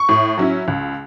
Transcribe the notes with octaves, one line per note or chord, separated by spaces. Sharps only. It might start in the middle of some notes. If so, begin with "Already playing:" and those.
Already playing: C#6
A2
F#3 C#4 E4
C#2